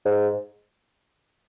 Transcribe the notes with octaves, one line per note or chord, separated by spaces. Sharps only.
G#2